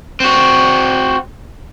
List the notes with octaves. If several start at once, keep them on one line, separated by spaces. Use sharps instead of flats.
C4 F#4